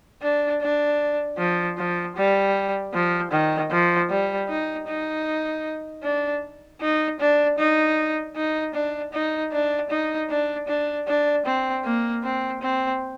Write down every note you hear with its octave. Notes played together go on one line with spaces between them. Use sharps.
D4
D4
F3
F3
G3
F3
D#3
F3
G3
D#4
D#4
D4
D#4
D4
D#4
D#4
D4
D#4
D4
D#4
D4
D4
D4
C4
A#3
C4
C4